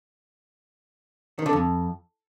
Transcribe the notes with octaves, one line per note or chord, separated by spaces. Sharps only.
D#3
D3
F2